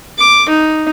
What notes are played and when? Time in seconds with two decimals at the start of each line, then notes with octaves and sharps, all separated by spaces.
0.18 D6
0.49 D#4